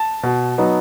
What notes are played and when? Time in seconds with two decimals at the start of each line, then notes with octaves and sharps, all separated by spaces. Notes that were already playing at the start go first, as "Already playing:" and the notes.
Already playing: A5
0.23 B2
0.58 F#3 B3 D#4